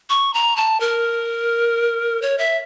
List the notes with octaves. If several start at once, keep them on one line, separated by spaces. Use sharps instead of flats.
C#6
A#5
A5
A#4
C#5
E5